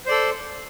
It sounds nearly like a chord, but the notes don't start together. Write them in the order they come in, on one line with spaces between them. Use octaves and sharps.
C5 D5 A4